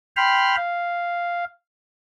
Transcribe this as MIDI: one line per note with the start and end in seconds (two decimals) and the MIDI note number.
0.17 0.56 79
0.17 0.56 83
0.17 0.56 84
0.17 0.56 89
0.57 1.45 77